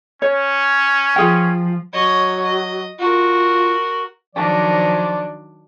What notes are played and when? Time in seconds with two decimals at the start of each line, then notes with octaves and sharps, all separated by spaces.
0.22 C#4 C#5
1.16 F3 F4 G#4 G5
1.93 F#3 C#5 D#5
2.44 D#5
2.99 F4 F#4 A#4
4.36 D#3 F3 F#3 D4 D5